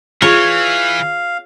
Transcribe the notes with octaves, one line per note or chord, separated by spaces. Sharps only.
E3 F4 G#4 C#5 F5